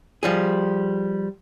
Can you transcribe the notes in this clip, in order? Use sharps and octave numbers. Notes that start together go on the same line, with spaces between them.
F3 G3 G#4